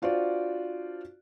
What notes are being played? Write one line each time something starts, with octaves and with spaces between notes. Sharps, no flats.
D4 F4 F#4 C5 D5